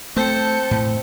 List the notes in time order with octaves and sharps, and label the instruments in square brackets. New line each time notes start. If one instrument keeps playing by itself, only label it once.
[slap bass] A3 [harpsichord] C4 C5 [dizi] A5 [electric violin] G6 C#7
[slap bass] A2